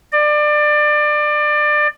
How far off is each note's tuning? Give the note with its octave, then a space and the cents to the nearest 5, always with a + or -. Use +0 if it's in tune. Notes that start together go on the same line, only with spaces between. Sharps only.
D5 +25